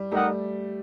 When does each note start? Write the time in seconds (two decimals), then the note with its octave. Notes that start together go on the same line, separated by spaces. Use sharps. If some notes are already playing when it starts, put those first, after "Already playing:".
Already playing: G3
0.12 G3 A3 D#4 G4 A#4 D#5 F#5